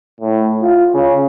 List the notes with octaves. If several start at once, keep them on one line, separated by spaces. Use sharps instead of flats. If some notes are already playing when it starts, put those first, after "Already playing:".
A2
F4
C#3